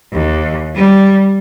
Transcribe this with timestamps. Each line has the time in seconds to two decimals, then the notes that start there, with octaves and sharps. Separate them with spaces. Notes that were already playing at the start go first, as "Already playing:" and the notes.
0.12 D#2
0.75 G3